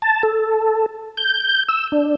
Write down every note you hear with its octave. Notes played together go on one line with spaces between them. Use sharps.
A5
A4
G6
E6
D4